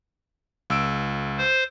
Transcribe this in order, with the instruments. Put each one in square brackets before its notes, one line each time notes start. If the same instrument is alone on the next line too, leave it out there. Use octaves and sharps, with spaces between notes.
[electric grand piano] C#2 E6 D7
[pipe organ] C5